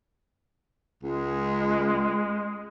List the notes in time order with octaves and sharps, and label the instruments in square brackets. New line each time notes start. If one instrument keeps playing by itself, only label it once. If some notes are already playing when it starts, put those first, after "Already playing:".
[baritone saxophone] C#2 [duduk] G#3